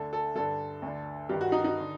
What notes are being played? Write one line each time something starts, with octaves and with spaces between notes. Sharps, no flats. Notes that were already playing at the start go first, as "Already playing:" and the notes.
Already playing: D2 D3 A4
A4
G2 D3 A4
D2 D3
G2 D#3 G4
F#4
D#4
D#4
D3